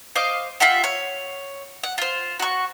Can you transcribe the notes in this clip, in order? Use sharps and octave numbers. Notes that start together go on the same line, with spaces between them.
C5 D#5 F5 D6
F4 G4 E5 F#5
C#5
F#5
F4 C5
F#4 C#6